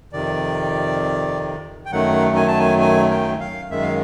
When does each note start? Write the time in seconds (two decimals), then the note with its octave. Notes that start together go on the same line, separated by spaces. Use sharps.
0.13 F2 C3 D#3 D5
1.85 G5
1.92 F#2 D#3 F#3 A3 F#5
2.36 G#5
2.48 A5
2.59 G#5
2.81 G#5
3.11 G5
3.40 F5
3.70 F#2 D#3 G#3 E5
3.83 F5